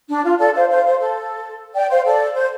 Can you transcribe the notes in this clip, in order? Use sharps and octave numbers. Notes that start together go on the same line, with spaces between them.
D4
F4
A4 D5
C5 F5
C5 F5
C5
A4
D5 G5
C5 F5
A4 D5
C5